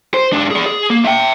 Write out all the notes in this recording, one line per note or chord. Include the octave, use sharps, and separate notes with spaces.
C5
G#2 D4
G#4 D5
G#4
A#3
E5 G5